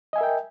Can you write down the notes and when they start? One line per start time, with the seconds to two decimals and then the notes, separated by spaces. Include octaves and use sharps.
0.13 D#5
0.16 G#5
0.18 E5
0.21 A#4
0.23 G5